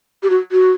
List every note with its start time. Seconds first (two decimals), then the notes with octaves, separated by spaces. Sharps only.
0.23 G4
0.30 F#4
0.52 F#4